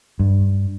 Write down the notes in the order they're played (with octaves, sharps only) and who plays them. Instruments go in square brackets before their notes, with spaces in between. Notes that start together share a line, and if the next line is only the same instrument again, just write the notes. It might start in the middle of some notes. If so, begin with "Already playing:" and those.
[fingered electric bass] G2